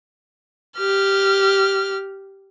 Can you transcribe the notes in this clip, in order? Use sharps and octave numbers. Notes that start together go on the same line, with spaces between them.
G4 F6